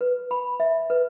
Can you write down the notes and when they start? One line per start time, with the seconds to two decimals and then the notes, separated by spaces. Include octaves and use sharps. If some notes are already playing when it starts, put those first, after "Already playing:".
0.01 B4
0.31 B5
0.60 E5
0.90 B4